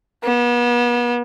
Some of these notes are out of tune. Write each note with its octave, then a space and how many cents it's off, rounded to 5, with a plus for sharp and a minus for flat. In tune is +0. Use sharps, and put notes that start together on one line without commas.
B3 -35